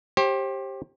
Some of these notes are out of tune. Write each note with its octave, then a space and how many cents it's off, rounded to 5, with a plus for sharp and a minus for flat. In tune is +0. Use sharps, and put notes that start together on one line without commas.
G4 +0 C5 +35